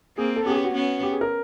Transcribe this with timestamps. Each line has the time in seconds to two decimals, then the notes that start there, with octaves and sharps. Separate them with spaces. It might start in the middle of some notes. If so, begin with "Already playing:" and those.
0.17 A#3 C4 G#4
0.36 A4
0.46 B3 C#4 G4
0.50 G#4
0.56 G4
0.64 F#4
0.74 B3 C#4
1.03 G4
1.12 G#4
1.21 A#4